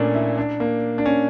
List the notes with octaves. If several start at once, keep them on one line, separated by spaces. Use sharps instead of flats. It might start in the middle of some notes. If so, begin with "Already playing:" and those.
Already playing: A#2 A3 A#3 C#4 D4
E4
D4
A#3
D4
C#4